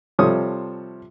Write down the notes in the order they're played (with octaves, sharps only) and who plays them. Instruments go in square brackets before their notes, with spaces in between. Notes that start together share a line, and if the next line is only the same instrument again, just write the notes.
[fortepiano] C3 F3 G3 A4 C#5 D#6